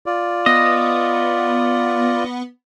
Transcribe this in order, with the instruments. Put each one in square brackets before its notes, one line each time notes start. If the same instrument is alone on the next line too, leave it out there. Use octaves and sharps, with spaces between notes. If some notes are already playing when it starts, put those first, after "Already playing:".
[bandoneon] F4 D5
[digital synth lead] B3 [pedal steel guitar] D#5